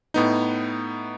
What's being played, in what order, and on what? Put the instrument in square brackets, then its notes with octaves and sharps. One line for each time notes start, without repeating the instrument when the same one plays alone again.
[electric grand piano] A2 B3 D#4